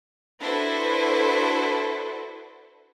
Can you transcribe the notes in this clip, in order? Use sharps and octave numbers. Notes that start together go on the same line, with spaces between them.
D4 E4 F#4 A4 B4 C5